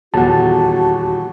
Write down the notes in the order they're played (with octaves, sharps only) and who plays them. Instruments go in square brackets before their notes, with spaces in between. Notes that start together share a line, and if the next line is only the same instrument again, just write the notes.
[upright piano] D#1 E2 [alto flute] F#4 [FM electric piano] F#5 A5